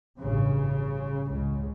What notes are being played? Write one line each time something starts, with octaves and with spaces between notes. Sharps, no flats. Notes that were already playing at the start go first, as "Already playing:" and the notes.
A1 G2 C#3
C#2 C#3